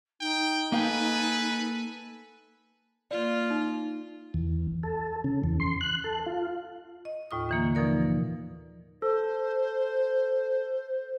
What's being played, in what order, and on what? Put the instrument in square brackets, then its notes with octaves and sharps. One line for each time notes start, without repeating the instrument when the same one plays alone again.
[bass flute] D#4 [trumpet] G5
[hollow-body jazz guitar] A#3 F5 G5 [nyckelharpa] A4 G#5 [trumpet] B4
[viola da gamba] A#3 F4 [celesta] D5
[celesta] D#4
[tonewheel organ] E2
A4
C#3
E2
C6
F#6
A4
F4
[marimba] D#5
D#2 A2 F4 D#6
D3 E3 A#3
B2 F3 D#4 A#4 D5
[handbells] A4 [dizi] C5